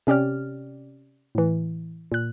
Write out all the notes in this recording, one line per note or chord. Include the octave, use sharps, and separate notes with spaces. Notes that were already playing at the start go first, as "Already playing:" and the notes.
C3 C#4 G4 D5 F6
A2 E3
A#2 F#6